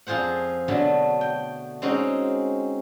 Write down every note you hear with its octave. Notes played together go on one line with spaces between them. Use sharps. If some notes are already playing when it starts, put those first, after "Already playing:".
F2 F3 F4 G#4 C5 F#5
B2 D3 F#3 A3 D4
G5
G#3 C4 C#4 D#4 F#4